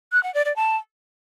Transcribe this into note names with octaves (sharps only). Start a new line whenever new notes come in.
F#6
F#5
D5
D5
A5